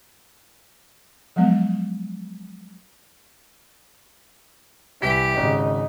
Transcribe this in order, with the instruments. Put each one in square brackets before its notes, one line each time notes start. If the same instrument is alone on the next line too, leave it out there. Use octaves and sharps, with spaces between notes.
[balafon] F3 F#3 G#3 B3
[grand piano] C2 B6 [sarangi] E3 [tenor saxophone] G4
[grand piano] G#1 C#3 [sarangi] D#4